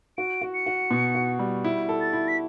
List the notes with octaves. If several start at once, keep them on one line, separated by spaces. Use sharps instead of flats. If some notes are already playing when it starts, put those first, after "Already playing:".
F#4 D7
F#4
C#7
F#4
B2
F#4
G3
E4
A4
A6
E4
B6